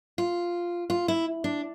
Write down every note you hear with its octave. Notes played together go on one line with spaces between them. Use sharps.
F4
F4
E4
D4